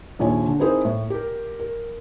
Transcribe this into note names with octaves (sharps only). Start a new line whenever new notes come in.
A#1 D#2 F4 C#5 G#5
D3
C4 D#4 E4 G#4 A#4 C5
A2
G4 A#4
A#4